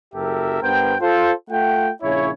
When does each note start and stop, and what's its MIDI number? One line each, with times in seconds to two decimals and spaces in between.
0.14 0.60 30
0.14 0.60 42
0.14 0.60 67
0.14 0.60 69
0.14 0.60 70
0.14 0.60 76
0.62 0.96 43
0.62 0.96 59
0.62 0.96 70
0.62 0.96 72
0.62 0.96 79
1.01 1.32 65
1.01 1.32 69
1.01 1.32 72
1.51 1.90 57
1.51 1.90 65
1.51 1.90 78
1.51 1.90 79
2.02 2.31 34
2.02 2.31 49
2.02 2.31 64
2.02 2.31 73